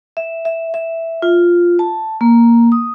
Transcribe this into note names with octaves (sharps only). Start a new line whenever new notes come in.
E5
E5
E5
F4
A5
A#3
D#6